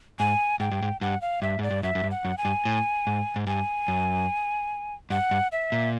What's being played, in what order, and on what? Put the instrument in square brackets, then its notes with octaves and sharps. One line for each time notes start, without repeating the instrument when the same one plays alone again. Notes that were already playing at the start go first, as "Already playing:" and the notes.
[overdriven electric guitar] G#2 [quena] G#5
[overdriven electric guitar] G#2 [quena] G5
[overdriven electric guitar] G2
G#2
[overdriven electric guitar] G2 [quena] F#5
[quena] F5
[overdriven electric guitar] G2 [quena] E5
[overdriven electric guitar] G#2 [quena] D5
[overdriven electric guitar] G2
[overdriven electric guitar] F#2 [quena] E5
[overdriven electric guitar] F#2
G2
[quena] F#5
[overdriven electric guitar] F#2
[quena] G#5
[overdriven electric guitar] G2
A2
G#2
G#2
[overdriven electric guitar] G2 [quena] G#5
[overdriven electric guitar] F#2
[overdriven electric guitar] G2 [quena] F#5
[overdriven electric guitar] G2
[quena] E5
[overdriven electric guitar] A#2